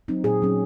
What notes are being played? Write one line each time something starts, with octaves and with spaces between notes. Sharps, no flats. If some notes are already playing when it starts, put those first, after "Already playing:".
F#3 C4 D#4
A#2 G#4
F#3 C#4